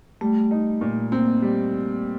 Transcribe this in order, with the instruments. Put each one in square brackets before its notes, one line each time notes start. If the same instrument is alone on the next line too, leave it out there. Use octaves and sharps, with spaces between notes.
[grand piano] G3 [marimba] A3
[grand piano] D#4
A#2
[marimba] A#3 [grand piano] C4
[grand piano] G3